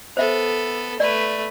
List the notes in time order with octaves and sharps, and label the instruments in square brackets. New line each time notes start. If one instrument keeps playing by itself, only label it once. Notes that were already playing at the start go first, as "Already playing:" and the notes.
[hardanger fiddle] B3 A4 [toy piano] C5 E5
[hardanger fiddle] A3 B4 [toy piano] D5